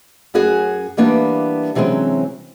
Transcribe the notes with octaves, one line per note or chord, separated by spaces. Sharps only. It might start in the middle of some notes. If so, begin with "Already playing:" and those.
F#2 C#4 F#4 G#4 F#5
E3 G3 A#3 B3 D4 E4
C3 E3 F#3 G#3 C4 C#4